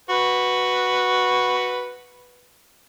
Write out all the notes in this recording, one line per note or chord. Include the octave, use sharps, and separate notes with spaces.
F#4 B4